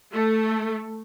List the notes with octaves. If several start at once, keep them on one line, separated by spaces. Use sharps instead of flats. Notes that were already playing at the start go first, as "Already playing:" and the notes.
A3